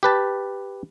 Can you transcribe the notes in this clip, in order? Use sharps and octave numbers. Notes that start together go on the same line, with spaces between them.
G4 B4 A5